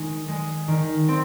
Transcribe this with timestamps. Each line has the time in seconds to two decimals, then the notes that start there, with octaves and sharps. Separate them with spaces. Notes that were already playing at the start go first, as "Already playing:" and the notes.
Already playing: D#3 G#3
0.28 G#3
0.68 D#3
1.08 C4